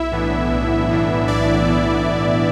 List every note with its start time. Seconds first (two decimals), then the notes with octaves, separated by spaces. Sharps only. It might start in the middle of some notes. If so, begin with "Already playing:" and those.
Already playing: B1 E4 E5
0.12 A2 E3 B3 D4
0.51 B1
0.89 A2 E3 B3 D4
1.28 B1 D4 D5
1.67 A2 E3 B3 D4
2.06 B1